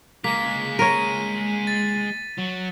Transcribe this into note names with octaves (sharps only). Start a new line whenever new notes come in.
G#3 A#3 F4 B6
A#4 C#5 D#7
A6
F#3